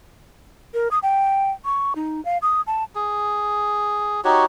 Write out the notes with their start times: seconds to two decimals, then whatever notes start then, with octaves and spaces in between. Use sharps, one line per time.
0.74 A#4
0.91 D#6
1.03 G5
1.65 C#6
1.96 D#4
2.25 F5
2.42 D#6
2.67 A5
2.95 G#4
4.25 D#4 F#4 G4 C#5